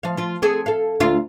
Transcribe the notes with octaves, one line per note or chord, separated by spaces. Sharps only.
F3 F5
F3 F4
C4 G#4 A4
A4 F5
D2 F4 F5